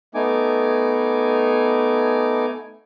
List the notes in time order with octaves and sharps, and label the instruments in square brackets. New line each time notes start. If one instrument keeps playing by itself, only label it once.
[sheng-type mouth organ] A3 B3 D#4 G#5 D6